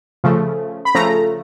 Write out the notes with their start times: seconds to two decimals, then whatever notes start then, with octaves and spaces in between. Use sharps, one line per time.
0.24 C#3 F3 A3
0.85 B5
0.95 C#3 F3 A3 A#5